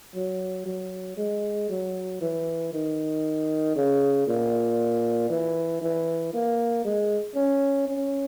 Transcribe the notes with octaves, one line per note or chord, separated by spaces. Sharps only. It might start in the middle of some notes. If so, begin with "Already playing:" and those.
F#3
F#3
G#3
F#3
E3
D#3
C#3
A#2
E3
E3
A#3
G#3
C#4
C#4